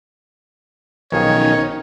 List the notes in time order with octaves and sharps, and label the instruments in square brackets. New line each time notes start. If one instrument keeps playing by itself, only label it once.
[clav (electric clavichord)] B1 F3 G#4 [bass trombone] D#3 [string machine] C#4 D#4 [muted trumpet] C#5